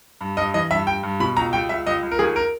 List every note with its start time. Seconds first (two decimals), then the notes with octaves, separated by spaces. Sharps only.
0.21 G2
0.37 G2 D#5
0.54 E3 D#5
0.71 G2 E5
0.87 G2 G5
1.03 G2
1.20 B2 B5
1.36 C#2 A#5
1.53 C#2 G5
1.69 C#2 E5
1.87 C#2 D#5
2.03 C#2
2.11 A#4
2.19 D#2 G#4
2.36 A#4